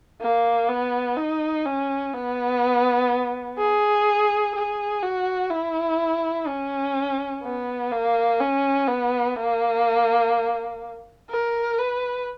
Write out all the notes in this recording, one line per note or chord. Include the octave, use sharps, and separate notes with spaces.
A#3
B3
D#4
C#4
B3
G#4
G#4
F#4
E4
C#4
B3
A#3
C#4
B3
A#3
A#4
B4